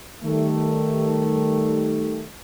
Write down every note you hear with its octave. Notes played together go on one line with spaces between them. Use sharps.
D#3 G3 A3